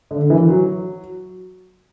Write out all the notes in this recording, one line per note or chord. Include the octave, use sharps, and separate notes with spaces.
D3
E3
F#3